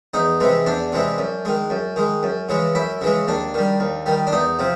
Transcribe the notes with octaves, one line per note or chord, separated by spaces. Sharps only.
E2 D#4
C3 E3 G#3
E2 D4
C3 E3 G#3
F#2
D#3 G#3
F#2
D#3 G#3
F#2
C#3 E3 G#3
F#2 E4
C#3 E3 G#3
D#2 D4
D#3 G3
D#2
D#3 G3
D4
E2 D#4
C3 F3